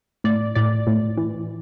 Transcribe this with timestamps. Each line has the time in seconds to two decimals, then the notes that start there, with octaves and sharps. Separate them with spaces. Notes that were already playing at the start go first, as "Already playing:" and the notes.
0.24 A2 D5
0.55 A2 D5
0.87 A2
1.18 E3